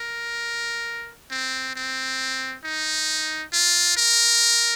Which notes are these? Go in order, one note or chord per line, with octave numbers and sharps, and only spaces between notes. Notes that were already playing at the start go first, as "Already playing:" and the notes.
Already playing: A#4
C4
C4
D#4
F4
A#4